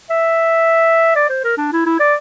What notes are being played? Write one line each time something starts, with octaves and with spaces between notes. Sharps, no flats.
E5
D5
C5
A#4
D4
E4
E4
D5